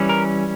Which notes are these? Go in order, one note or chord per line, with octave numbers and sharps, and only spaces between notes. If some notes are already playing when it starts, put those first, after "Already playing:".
Already playing: E3 G3 C#4
A#4